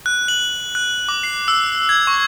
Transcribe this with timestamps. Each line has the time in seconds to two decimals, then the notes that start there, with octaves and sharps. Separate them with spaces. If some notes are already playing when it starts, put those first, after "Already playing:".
0.06 F#6
0.28 F#7
0.75 F#6
1.09 D6
1.23 C7
1.48 E6
1.89 G#6
2.07 C#6